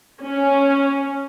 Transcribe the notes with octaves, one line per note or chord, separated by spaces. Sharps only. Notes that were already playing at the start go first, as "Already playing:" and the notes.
C#4